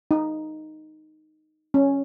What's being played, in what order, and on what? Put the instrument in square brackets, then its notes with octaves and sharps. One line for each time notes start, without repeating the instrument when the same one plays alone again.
[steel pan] D#4
C#4